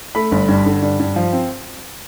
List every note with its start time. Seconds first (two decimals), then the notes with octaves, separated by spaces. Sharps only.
0.15 A3 B5
0.32 G1
0.48 G2
0.66 D3
0.82 G2
0.99 G2
1.16 F3
1.33 C4